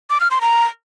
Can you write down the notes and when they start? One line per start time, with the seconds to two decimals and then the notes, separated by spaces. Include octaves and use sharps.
0.10 D6
0.20 F6
0.31 C6
0.41 A#5